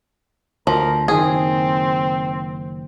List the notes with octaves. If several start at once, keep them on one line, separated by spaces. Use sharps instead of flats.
D2 F3 A#4
F#1 D#3 C4 G#4